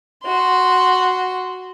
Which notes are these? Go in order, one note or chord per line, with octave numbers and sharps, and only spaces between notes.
F#4 C6